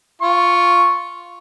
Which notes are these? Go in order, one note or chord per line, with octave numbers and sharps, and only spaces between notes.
F4 C#6